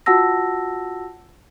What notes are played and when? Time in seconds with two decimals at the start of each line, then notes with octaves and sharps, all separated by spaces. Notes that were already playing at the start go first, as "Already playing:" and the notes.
0.06 F4 F#4 F#5 A5 E6 A#6